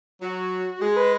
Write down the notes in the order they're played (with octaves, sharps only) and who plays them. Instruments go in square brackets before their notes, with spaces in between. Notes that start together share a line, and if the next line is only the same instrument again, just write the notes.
[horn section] F#3 [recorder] F#4
[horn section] G#3 [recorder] G#4
[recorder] B4